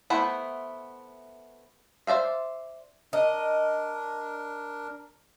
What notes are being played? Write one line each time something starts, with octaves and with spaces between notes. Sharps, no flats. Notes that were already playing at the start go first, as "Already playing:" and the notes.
A3 B3 E4 C5 F#5
C5 D5 E5 F5
D4 A#4 D#5